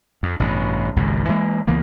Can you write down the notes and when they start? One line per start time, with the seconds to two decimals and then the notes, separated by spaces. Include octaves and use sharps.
0.23 F2
0.40 A1 G2 B2
0.96 G#1 C#2 F#2 A#2
1.28 E3 G#3 A#3
1.67 C#2 E3 A#3 B3